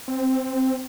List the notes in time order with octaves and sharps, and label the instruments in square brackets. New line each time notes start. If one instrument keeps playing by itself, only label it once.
[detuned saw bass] C4